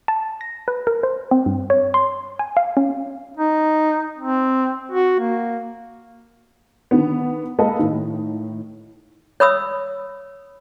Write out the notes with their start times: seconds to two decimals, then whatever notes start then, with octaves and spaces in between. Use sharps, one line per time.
0.08 A5
0.41 A#6
0.68 B4
0.87 A#4
1.03 C5
1.31 C4
1.46 G2
1.70 C#5
1.94 C6
2.39 G#5
2.57 F5
2.77 C#4
3.37 D#4
4.18 C4
4.91 F#4
5.19 A#3
6.91 D3 D#3 B3
7.58 G#3 A#3 A4 B4 D#5 F5
7.79 A2 D#3
9.40 C#5 B5 D#6 E6